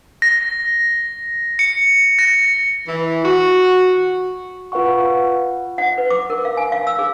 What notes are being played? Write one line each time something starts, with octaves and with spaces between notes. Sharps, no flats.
A#6
C#7
A#6
E3
F#4
F4 B4 F5 F#5 C#6
F#5
B4
D6
A#4
F5
G#5
F5
E6
G#4